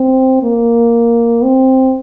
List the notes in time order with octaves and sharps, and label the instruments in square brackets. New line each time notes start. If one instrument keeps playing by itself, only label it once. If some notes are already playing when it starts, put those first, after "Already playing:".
Already playing: [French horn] C4
A#3
C4